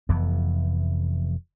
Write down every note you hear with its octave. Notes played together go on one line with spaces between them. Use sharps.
F1 F2 E3 B3